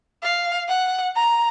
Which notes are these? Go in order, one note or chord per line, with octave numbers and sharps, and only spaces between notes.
F5
F#5
A#5